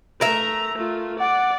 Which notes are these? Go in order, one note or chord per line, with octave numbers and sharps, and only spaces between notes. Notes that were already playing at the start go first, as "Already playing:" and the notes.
A3 A#4 E5 A#5
A3 F4
D5 F#5